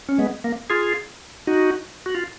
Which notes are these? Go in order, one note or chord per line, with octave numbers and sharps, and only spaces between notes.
C#4
G#3 B3
A#3
F4 G#4
D#4 F#4
F#4
F4